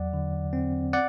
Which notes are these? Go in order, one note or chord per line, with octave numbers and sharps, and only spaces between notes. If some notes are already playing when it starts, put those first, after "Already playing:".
Already playing: E2 F#3 D5 F#5
D3
C4
D5 F#5